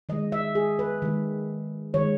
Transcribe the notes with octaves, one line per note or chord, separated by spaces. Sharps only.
D#3 G#3 D#5
E5
G#4
B4
D#3 G#3
D#3 G#3 C#5